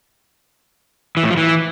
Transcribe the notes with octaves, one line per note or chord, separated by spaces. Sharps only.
E3
A2
F3
E3